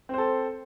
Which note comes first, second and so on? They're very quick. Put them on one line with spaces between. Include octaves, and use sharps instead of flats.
C4 C5 A4